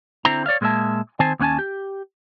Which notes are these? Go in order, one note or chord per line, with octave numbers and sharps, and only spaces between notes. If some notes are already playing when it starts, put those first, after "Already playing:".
D3 C4 E4 A#5
C#5 D5 E5 F5
A#2 G#3 A#3 B3 E5 A5
D#3 C4 C5 G#5 A5
D#2 B3 C#4 F#5 G#5 A5
G4